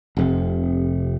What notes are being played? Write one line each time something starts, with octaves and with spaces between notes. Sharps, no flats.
F1 F2 C3